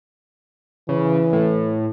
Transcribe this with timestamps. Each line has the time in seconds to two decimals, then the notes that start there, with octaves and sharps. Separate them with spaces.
0.89 C#3 E3
1.33 A2